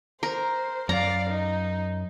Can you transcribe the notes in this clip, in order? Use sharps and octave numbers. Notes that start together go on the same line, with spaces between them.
A#4 C5
F#2 D5 F5 A#5
D#4